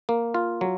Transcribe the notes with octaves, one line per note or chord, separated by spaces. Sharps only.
A#3
F4
F#3